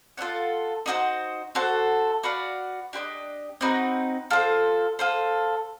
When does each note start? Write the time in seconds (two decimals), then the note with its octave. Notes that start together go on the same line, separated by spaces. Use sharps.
0.17 F4 A4 C#5 F#5
0.86 D#4 F#4 A4 C5
1.55 F#4 A4 C5
2.23 F#4 B4 D5 F5
2.93 D4 G4 C5 D#5
3.61 C4 D#4 F#4 B4
4.31 F4 A4 C5
4.99 F4 A4 C5